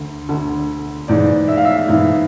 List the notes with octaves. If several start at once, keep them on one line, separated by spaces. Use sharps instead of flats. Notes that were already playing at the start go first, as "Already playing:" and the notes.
Already playing: D2 D3
D2 D3
G#2 E3 D5
E5
F5
E5
G#2 E3